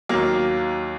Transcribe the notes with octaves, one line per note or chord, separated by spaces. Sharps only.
D#2 D#3 F#3 A#3